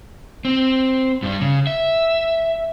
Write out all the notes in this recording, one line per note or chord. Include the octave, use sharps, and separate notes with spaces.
C4
G2 G3
C#3
E5